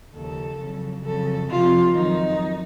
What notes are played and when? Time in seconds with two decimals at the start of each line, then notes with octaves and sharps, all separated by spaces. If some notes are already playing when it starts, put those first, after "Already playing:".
0.14 D#2 C#3 F3 A4
0.59 F2 C#3 F#3
1.04 F2 C#3 F#3 A4
1.49 F2 C3 F3 F4
1.94 F2 D#3 F#3 D#4